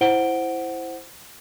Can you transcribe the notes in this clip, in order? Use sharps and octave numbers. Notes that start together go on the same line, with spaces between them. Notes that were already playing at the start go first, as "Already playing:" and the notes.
E4 C5 F#5 D7 G7